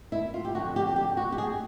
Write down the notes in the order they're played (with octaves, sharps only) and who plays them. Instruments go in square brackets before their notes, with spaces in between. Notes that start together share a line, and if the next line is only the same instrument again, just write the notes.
[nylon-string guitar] E4
F4
G4
F2 D3 F#4
G4
G4
F#4
G4
G#4